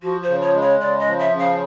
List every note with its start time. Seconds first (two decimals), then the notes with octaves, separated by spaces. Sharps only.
0.03 F3 F#4
0.23 C5
0.29 C#3
0.42 C#5
0.55 G#3
0.62 C#5
0.81 C#3 D5
1.00 D#5
1.07 F3
1.19 E5
1.33 C#3
1.39 F5